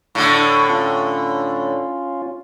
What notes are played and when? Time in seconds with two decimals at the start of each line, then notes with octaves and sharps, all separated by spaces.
0.15 A2 D3
0.69 C#4 F4